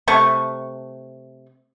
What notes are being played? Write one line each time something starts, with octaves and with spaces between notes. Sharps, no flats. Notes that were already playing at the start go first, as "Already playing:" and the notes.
C3 A3 C#6